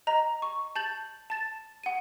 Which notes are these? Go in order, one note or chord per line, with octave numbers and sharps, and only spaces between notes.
D#5 A#5
C#6
A5 G6 A6 F#7
A5 A6 E7
F#5 D#7